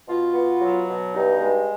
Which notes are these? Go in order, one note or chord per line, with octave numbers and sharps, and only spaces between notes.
B2 F4
B3
F#3
B2
G2 D#4
G#3